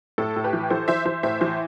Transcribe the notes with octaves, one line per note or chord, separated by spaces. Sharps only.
A2 A4
A2
G4 B4
E3
E3 A4 C5
E3 C5 E5
E3 C5 E5
A2 C5 E5
E3 C5 E5